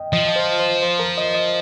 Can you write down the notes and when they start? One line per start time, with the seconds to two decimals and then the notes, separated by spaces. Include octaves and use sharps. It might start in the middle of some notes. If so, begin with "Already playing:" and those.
Already playing: D#5 G5
0.13 F3 D#5
0.29 D#5
0.36 C5
0.60 C5
0.82 C5
0.99 A#4
1.18 D#5
1.34 D#5